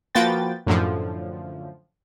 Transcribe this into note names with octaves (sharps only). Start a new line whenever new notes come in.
F3 A#3 F#4 B4 G5 A6
F#2 A2 D3 F3